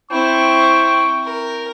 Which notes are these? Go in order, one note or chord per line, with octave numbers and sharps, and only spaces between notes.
C4 E4 G5 C#6
A#4